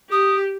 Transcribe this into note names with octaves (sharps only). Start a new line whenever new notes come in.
G4 D#6